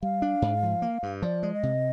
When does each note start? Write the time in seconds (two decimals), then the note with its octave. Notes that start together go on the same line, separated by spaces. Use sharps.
0.03 G3 F5
0.22 D4
0.42 G#2
0.63 F3
0.82 A#3
1.03 G2
1.22 F3 D5
1.43 G#3
1.53 D#5
1.63 C3